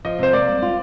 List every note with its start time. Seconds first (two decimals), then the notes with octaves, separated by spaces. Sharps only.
0.05 F3 D#5
0.19 C3 C5
0.33 A#3 D5
0.48 G3
0.62 F4